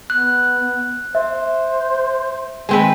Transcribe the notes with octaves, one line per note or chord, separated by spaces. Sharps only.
B3 F#6
C5 E5
D#3 G#3 C4 B4